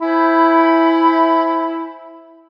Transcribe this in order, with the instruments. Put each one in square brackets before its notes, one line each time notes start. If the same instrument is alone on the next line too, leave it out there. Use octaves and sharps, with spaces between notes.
[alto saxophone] E4 [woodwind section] C5 G#5 B5